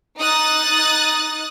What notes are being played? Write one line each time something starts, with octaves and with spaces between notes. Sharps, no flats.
D#4 D#6 F#6 A6